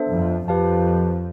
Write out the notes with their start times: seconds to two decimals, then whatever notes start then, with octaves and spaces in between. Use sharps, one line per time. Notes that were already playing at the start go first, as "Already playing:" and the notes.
Already playing: B3 D4 A4 C5 E5
0.12 F2 F3
0.47 F2 F3 G4 B4 F5 A5